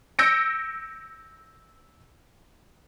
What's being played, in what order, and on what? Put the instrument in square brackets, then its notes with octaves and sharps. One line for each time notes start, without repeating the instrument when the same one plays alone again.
[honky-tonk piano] E6 G6 A#6 C#7 D7